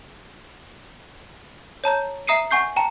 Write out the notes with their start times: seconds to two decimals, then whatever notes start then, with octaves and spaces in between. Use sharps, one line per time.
1.84 C#5 A5 A#5 G6
2.27 E5 A#5 D#6 C7 C#7 D#7
2.51 F#5 G#5 C#6 G6 C7
2.76 G5 A5 A#5